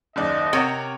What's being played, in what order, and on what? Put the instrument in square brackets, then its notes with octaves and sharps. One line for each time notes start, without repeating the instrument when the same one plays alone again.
[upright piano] F#1 D#2 D5 [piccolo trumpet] D#5
[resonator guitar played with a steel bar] C3 [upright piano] A#4 C#5 F#5